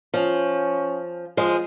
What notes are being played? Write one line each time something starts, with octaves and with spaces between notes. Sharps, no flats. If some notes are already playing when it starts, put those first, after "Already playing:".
F3 C#4
F3 G#3